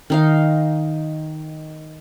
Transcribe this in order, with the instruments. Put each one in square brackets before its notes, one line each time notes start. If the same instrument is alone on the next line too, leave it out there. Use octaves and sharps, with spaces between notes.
[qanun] D#3 D#4 F5